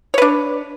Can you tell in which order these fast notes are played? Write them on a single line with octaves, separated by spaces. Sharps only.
C#5 B4 D4